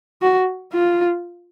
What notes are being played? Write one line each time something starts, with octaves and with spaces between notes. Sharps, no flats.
F#4
F4